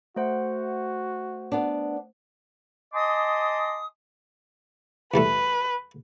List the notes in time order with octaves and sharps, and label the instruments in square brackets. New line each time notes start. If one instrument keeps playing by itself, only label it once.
[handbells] A3 C5 F#5 [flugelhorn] F#4
[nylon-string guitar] B3 D4
[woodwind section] D#5 G#5 A5 C6 D6 D#6
[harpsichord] E2 G3 A3 [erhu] B4